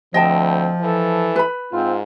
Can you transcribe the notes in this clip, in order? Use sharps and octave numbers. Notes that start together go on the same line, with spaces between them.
D2 F3 C4 D#5 G5 A5
E3 A4
B4 B5
G#2 C4 F4